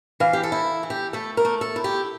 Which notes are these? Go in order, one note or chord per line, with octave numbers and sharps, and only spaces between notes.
E3 F5
G4
A4
E4
E3
G4
A3 A4
A#4
A3
A4
E4
G4